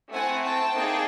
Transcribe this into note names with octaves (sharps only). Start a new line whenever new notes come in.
A3 C4 E4 F#5 G#5
G5 A5
A#3 D#4 G#4